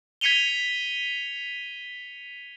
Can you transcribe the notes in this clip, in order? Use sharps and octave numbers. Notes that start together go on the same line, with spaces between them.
G#6 B6 C#7 D#7 F7 G7